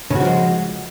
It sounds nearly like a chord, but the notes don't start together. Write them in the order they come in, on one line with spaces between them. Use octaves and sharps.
C#3 F#4 F3 G#3